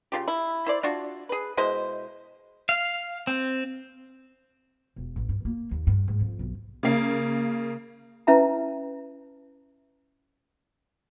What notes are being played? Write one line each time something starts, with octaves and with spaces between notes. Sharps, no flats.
C#3 F4 G4
E4
E4 C5 D5
D4 F4 F#4
G#4 B4
B2 G#3 E4 C5
F5
C4
E1
A1
G2
A#3
D#2
G2
G#2
F2
B1
C#3 A#3
C#4 E4 B4 E5 A5 A#5